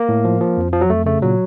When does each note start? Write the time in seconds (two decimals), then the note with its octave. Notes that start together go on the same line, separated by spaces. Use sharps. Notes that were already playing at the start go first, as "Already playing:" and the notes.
Already playing: A#3
0.09 A2
0.25 F3
0.41 F3
0.57 F2
0.73 F3
0.81 F#3
0.89 F2 A3
1.06 C#3 A3
1.22 A#2 F#3